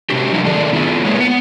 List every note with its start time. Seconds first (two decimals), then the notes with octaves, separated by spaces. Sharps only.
0.10 C3 D4 F#4 G4
0.32 F3 F#3 G#3 D#4 E4
0.44 D3 D#3 A3 D4 G#4
0.73 B3 E4 F4 G#4
1.05 G#3 A#3 G#4 B4 C#5
1.19 B3 F#5